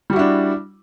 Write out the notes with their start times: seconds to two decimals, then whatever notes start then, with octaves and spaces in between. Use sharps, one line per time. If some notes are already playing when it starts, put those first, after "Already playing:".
0.10 G3
0.13 F#4
0.16 E4
0.19 D4